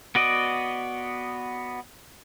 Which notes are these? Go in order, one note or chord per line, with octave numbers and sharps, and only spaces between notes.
B3 F#4 D5 D#5